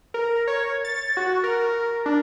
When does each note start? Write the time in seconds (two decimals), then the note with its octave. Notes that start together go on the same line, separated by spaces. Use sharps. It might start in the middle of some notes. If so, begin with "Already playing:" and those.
0.14 A#4
0.47 C#5
0.85 A6
1.17 F#4
1.44 A#4
2.06 D4